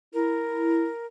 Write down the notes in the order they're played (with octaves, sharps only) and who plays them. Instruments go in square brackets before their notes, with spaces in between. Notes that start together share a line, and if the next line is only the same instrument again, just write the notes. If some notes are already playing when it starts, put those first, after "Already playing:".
[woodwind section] E4 [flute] A#4